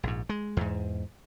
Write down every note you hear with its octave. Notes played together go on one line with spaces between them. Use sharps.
A#1 G#2
G#3
E2 G#2